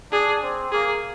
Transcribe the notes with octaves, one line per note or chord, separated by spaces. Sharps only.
D4 G#4
C4
A#3 G#4